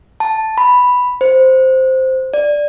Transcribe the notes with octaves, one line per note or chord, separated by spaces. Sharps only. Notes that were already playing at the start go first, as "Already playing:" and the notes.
A5
B5
C5
D5